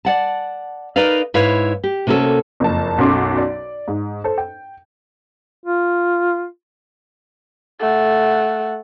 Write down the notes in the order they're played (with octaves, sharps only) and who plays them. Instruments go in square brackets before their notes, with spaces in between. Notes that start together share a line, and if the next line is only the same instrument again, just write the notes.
[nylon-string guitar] D5 F#5 A5
D#4 A#4 B4 D5 F5
G#2 E4 B4 C#5 F5
G4
C3 A#3 C#4 F#4 A4
[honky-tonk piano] F#1 F2 A5
B1 F#2 F#4 A4 C6 D6
D5
G#2
A4 C5
G5
[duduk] F4
[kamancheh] A3 F#5